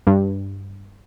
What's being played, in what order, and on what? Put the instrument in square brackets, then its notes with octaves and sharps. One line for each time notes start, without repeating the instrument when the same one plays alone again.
[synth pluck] G2